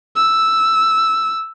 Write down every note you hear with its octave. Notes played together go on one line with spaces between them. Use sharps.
E6